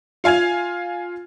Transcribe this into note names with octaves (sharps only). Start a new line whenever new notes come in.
F4 F5 G#5 G#6 F7